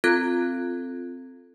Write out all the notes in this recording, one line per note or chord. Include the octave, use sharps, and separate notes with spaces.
C4 F4 A4 F#6 G#6